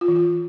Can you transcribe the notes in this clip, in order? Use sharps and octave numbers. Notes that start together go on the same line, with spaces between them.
F4
E3
F4